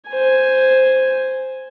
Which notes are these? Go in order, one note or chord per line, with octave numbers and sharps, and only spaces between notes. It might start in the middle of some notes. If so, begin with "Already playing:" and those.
C5 G#5